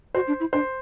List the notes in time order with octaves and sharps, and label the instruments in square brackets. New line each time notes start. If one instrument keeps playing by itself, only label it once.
[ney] F#4 [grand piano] C5
[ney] D4
E4
[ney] D4 [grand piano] C5